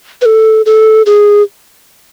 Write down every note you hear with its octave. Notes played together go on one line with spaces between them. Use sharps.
B4
A4
A4
G#4